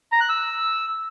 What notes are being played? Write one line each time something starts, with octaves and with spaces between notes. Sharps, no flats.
A#5
F#6
E6